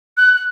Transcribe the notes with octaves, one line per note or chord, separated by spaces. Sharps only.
F#6
F#6